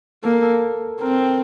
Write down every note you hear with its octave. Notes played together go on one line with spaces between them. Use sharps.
A#3 A4
A#4
A4
C4 A#4